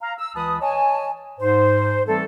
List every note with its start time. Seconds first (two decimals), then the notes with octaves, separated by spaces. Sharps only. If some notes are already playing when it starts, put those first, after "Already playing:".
0.02 F5 A#5
0.18 E6
0.36 C#2 E3 B4 A5 D#6
0.61 C#5 D#5 G#5 A5
1.39 G#2 C5
2.07 E3 G3 A3 C4 A4